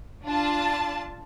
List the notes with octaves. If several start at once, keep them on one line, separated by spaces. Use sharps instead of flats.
D4 F4 A5